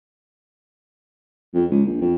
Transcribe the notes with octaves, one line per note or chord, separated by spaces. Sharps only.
F2
C#2
A#1
F2